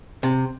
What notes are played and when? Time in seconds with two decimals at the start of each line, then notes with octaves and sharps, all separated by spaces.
0.23 C3